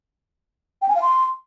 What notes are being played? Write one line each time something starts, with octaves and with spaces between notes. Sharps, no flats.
G5
G#5
F5
C6